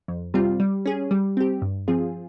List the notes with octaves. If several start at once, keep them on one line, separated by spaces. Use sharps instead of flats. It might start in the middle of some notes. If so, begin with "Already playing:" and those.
F2
C3 G3 C4 F4
G3
C#4 G#4
G3
C4 G4
G2
F3 C4 F4 G#4